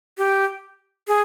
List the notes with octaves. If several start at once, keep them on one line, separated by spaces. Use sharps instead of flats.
G4
G#4